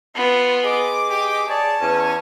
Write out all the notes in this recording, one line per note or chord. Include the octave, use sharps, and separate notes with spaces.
B3 F4
G#4 D#5 D6
G4
G#4 C#5 D5 A5
E2 C#4